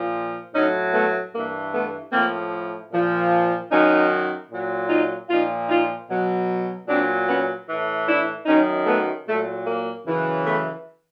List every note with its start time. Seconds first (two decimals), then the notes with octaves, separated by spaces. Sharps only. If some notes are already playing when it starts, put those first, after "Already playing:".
Already playing: A#2 F3
0.53 A2 F#3 C#4 D#4
0.93 A3 B3
1.33 G2 E3 A#3
1.72 A3 B3
2.12 A2 F3 A#3 C4
2.92 A#2 F3
3.70 F#2 D#3 F#3 C#4 D#4
4.50 A#2 F#3
4.89 D#4 F4
5.29 A#2 F3 D#4 F4
5.69 D#4 F4
6.09 B2 F#3
6.87 A#2 F#3 C4 D4
7.27 B3 C#4
7.67 A2 E3
8.07 D4 E4
8.46 F#2 D#3 F#3 C#4 D#4
8.86 A3 B3
9.26 A#2 F#3 A3
9.66 A#3
10.05 F#2 C#3 E3
10.45 A3 B3